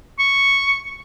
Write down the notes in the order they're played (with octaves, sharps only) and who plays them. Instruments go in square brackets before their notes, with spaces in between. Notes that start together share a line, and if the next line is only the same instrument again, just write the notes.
[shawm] C#6